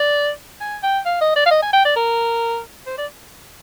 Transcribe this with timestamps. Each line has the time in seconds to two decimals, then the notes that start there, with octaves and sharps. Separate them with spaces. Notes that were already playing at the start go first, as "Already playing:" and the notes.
Already playing: D5
0.61 G#5
0.83 G5
1.06 F5
1.21 D#5
1.36 D5
1.46 F5
1.51 D#5
1.62 G#5
1.73 G5
1.85 D5
1.96 A#4
2.87 C5
2.98 D5